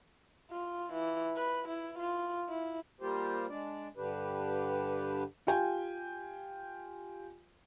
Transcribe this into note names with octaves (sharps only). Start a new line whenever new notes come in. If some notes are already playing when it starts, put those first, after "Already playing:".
F4
E3
B4
E4
F4
E4
G3 A#3 F4 G4 C5
G#3 D4 D5
G2 D3 D4 G4 B4
F4 G4 G5 G#5